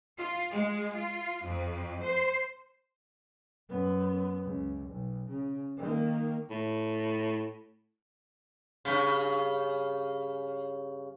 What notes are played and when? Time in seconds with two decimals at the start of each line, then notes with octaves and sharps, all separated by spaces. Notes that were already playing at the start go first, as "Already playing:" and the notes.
0.17 F4
0.50 G#3
0.95 F4
1.45 F2
2.03 C5
3.69 F#2 B3
4.45 C#2
4.89 B1
5.29 C#3
5.77 D#3 A#3
6.50 A2
8.85 G2 C#3